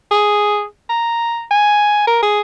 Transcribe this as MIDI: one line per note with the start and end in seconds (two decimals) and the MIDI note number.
0.11 0.64 68
0.89 1.44 82
1.51 2.05 80
2.07 2.21 70
2.23 2.41 68